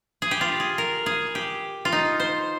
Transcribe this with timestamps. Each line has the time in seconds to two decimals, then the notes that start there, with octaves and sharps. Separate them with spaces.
0.22 G#4
0.31 G4
0.41 F4
0.60 G#4
0.78 A#4
1.06 G#4
1.35 G4
1.85 F4
1.92 D#4
2.20 C5